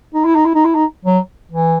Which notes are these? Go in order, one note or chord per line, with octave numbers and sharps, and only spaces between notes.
D#4
E4
D#4
E4
D#4
E4
D#4
F#3
E3